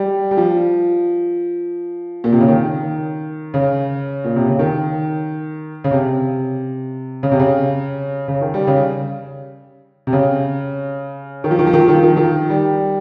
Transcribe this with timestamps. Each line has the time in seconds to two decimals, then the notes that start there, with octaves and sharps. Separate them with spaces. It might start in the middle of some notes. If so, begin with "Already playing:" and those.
Already playing: G3
0.31 G3
0.37 F3
2.24 A#2
2.32 C3
2.41 C#3
2.48 D#3
3.54 C#3
4.24 A#2
4.36 C3
4.48 C#3
4.59 D#3
5.84 C#3
5.91 C3
7.23 C#3
7.32 C3
7.40 C#3
8.28 C#3
8.41 D#3
8.54 G3
8.67 C#3
10.07 C3
10.13 C#3
11.44 D#3
11.51 F3
11.59 D#3
11.67 F3
11.73 D#3
11.81 F3
11.88 D#3
11.95 F3
12.02 D#3
12.10 F3
12.17 D#3
12.50 G3